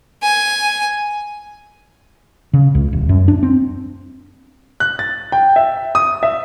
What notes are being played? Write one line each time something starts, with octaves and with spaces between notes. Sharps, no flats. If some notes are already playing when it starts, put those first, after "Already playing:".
G#5
C#3
C#2
D#1
F#2
D4
C4
F#6
A6
G5
E5
D#6
E5